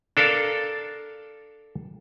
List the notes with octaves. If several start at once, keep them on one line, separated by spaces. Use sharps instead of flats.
D4 A4 A#4 F5